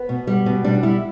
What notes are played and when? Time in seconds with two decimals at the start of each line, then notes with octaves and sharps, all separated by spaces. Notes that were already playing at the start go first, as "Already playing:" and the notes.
Already playing: B3
0.09 B2
0.27 G3
0.46 B2
0.64 G3 D4
0.75 D4
0.83 G3 E4